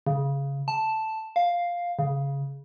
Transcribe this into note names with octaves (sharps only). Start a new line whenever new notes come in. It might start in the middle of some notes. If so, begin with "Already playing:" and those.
C#3
A5
F5
C#3